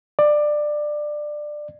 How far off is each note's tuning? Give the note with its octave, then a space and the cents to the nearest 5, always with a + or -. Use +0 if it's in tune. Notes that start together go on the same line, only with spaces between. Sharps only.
D5 +15